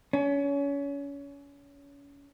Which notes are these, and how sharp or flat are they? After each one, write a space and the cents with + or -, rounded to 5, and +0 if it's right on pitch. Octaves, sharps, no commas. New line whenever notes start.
C#4 +30